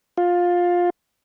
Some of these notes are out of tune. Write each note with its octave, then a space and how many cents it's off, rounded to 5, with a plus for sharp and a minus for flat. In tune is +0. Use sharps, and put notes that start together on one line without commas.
F4 +15